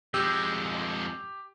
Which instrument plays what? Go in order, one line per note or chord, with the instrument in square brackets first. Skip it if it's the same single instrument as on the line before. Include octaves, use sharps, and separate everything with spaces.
[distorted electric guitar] F2 G#3 [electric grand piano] G4 [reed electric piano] E6 G6